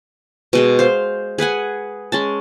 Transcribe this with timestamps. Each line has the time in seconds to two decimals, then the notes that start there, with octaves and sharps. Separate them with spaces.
0.53 B2 G#3 G#4
0.79 C5 F5
1.38 G#4 B4 F#5 G#5
2.12 G#3 C#4 A5